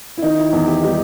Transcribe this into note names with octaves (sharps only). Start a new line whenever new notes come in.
E4
D#3 D#4
E4
E2
G4
G3 D#4